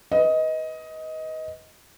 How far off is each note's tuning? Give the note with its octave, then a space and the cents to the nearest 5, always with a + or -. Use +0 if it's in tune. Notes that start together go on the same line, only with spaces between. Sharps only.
B4 +0 D#5 +15